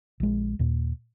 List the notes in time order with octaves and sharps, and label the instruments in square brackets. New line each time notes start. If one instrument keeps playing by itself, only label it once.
[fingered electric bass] A#1 G#3
D#2 A#2